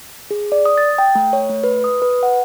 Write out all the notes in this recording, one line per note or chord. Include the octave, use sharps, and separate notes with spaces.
G#4
D5
D#6
A6
G5
A3
C#5
A3
B4
D#6
B4
F#5